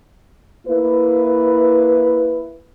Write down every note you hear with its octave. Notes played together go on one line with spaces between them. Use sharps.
A#3 E4 B4